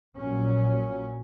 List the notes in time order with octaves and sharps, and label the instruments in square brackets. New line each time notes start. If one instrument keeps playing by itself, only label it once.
[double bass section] A#1 A#2 F#3 C#4